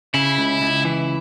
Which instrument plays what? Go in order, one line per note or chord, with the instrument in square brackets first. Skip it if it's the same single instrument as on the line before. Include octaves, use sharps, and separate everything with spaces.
[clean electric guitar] C#3 [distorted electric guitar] E4
[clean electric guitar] C#2
C#2
E3